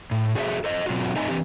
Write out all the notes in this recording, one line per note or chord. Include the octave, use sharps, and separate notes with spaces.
A2
F#4 G#4 A4 C5 D#5 E5
A4 C5 D#5
B2 F#3 C4 F4 F#4
A3 C4 D#4 D#5 E5 G#5
E3 C4 G4